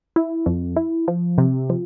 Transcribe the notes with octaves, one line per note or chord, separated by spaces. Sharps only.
E4
F2
E4
F3
C3
F3